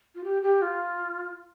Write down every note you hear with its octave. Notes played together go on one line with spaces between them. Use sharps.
F4
G4
G4
F4